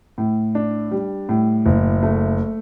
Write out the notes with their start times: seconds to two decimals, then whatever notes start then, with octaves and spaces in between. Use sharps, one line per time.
0.18 A2
0.55 D4
0.91 G3
1.29 A2
1.66 F#1
2.03 A3